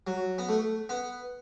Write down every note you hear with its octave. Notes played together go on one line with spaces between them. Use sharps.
F#3
B3
A3
B3